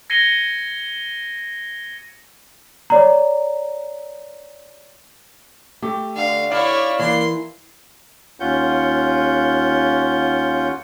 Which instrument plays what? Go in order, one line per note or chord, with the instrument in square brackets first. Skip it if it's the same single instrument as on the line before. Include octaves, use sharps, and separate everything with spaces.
[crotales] G#6 A#6 C7 C#7 D#7 G7
[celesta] C#5 D5 A#5
[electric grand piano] A3 [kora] G4 A4
[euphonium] D3 [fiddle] F5
[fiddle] E4 C#5 [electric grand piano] D5 F5
[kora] E3 [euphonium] A#3 [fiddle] C6
[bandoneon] D#2 C#4 F4 F#5 G6